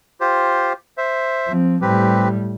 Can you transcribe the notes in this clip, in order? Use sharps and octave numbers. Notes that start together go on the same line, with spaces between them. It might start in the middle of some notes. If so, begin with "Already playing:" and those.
F4 G4 C5
C5 E5
F3 C4
A2 G3 C4 G4 B4